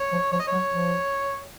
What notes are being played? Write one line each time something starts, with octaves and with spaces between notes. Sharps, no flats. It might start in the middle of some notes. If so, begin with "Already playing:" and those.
Already playing: C#5
F3
F3 C#5
D#5
F#3 C#5
F3